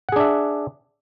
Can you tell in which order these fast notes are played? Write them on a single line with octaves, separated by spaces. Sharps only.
F#5 G#4 D4 E5